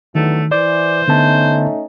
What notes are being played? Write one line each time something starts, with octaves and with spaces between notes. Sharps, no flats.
E2 D3 D#3 F#3 A3
E3 C5 D5 D6
D3 A3 B3 C#4 D#4 A5